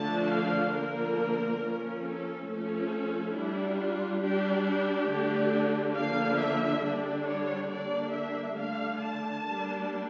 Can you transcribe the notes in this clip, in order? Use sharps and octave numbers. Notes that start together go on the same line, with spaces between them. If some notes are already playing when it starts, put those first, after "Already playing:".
Already playing: D3 F3 A3 D4 A5
F5
D3 F3 A#3 A#4
F3 A#3 C#4
A4
F3 A3 C#4 A4
G3 D4 E4
F4
G3 D4 G4
G4
D3 A3 D4
D3 F3 A#3 D4 F5
E5
D3 G3 D4
C#5
D3 G3 A#3 D4 D5
E5
D3 A3 D4 F5
A5
G3 A#3 D4